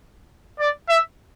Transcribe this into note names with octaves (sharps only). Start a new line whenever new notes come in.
D5
E5